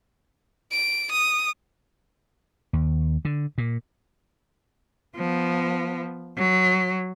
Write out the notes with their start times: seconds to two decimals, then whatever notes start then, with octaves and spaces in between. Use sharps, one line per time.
0.72 D7
1.12 D#6
2.73 D#2
3.25 D3
3.58 A#2
5.16 F3 B3
6.37 F#3